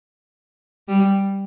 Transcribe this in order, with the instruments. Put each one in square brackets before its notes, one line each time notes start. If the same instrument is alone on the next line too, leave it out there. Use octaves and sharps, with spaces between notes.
[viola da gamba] G3